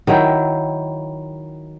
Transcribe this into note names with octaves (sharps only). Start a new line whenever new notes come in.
D#3 F#3 E4 G5